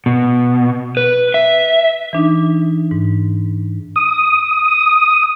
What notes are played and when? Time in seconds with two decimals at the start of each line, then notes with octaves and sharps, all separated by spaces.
0.06 B2
0.97 B4
1.34 E5
2.13 E3 D4 D#4
2.91 G#2
3.96 D#6